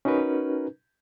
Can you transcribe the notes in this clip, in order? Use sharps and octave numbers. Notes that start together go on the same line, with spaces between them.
C#4 D#4 F#4 A#4 B4